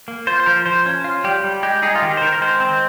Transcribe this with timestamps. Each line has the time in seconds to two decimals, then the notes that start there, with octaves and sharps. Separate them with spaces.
0.08 A#3
0.27 F4 C5
0.40 C5
0.46 F3 A#4
0.66 F3 C5
0.86 C#4
1.04 F4
1.24 G3 G4
1.44 G3
1.63 G#3 G4
1.82 D#4 G#4
1.95 F4
2.02 D#3 G4
2.17 C5
2.22 D#3 A#4
2.33 A#4
2.41 G#3 C5
2.60 C4